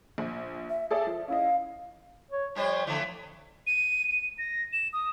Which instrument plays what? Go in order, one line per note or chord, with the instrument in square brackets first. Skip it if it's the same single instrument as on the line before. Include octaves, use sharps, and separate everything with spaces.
[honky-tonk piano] A#1
[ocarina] E5
[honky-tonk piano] G#4 A4 D5 [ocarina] E5
[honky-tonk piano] F3
[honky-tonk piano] C#4 E4 D#5 [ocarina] F5
[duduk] C#5
[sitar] F3 G3 C5 [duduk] C#5
[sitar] A2 E3 F3 [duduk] D3
[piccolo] D#7
D#7
A#6
E7
D#6